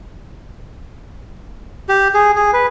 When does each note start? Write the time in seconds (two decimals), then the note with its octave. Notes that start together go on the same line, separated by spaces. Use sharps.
1.89 G4
2.14 G#4
2.36 G#4
2.53 B4